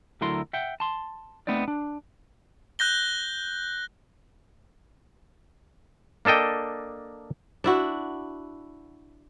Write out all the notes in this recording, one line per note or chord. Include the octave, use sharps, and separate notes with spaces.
D2 F#3 E4 A4 A#4 C6
E5 F#5 G5
A5 C6
A3 B3 C4 D#4 D5
D4
F#6 G6 A#6 G7
A#3 D4 A4 D#5 G5
D4 E4 F#4